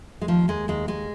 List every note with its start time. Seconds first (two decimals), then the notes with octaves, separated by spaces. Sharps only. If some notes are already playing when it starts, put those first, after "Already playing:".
0.21 G#3
0.28 D#2 F3
0.48 D#2 G#3
0.68 D#2 G#3
0.88 D#2 G#3